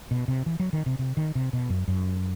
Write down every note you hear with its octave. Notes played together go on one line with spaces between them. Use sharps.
B2
C3
E3
F#3
D#3
C3
C3
D#3
C3
B2
F#2
F#2